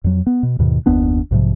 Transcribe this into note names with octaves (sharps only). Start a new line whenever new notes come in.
F2 F#3
B3
B2
D#2 G#2 B2 D#3
F#1 D#2 B3 D4
B1 G#2 C3 F3